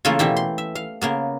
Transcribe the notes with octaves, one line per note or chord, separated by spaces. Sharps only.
C#3 E3 A3 A#3 F4 A4
B2 E3 G4 E5
C6
E5
F5
C#3 A#3 B3